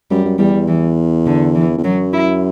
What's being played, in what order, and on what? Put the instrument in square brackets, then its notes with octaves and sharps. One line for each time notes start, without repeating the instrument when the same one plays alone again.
[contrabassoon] F#2 [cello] G3
[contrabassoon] F#2
[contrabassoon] E2 [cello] G3
[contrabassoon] E2
[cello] E3
D3
E3
[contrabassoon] E2
[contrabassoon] F#2 [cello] F#3
[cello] E4